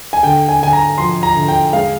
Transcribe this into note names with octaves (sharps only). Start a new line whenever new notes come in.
G#5
D3 G5
G#5
D3 G#5
A#5
F3 C6
A#5
D3
G5
G#3 F5